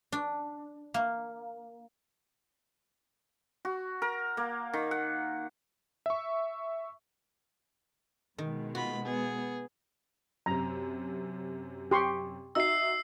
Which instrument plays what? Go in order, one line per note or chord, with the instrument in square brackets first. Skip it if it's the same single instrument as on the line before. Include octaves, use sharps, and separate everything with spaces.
[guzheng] D4
A#3
[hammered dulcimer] F#4
A#4
A#3
D#3
F#5
[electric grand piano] E5 C#6
[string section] B2 G#3 [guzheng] D#3
[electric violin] F4 B5 [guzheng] F#4
[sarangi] B3 [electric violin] G#4
[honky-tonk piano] F#2 C3 [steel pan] A#5
[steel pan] G4 C6 C#6
[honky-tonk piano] D#4 F#4 E5 [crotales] E6 C7